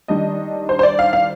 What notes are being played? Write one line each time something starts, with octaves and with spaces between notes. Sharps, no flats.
D#3 G3 D4 D#5
C5
C5
D5
F5
F5